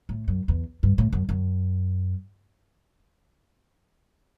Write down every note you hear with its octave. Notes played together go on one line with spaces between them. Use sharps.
A2
F#2
E2
G2
A2
F#2
F#2